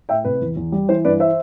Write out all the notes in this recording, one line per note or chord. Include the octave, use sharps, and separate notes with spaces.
A2 E5 G5
C3 B4
E2
E2
G3
E3 C5
G2 B4 D5
C5 E5